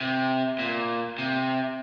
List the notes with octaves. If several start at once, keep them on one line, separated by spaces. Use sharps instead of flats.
C3
A#2
C3